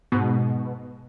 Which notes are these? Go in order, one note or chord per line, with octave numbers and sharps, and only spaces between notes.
G#2 B2